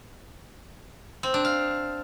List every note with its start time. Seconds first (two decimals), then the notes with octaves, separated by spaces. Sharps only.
1.23 C4
1.34 D4
1.45 F5